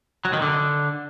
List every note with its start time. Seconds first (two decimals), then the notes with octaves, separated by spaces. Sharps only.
0.25 F#3
0.33 D#3
0.42 D3